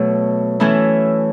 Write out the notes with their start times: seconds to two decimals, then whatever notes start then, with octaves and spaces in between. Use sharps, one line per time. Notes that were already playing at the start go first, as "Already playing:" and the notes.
Already playing: B2 F#3 A3
0.60 E3 A3 C#4 E4